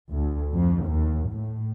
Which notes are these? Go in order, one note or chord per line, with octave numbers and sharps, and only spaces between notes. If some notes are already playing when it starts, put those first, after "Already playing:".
D2
F2
D#2
A2